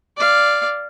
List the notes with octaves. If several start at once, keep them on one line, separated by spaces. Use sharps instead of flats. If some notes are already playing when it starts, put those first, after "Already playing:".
D5 F5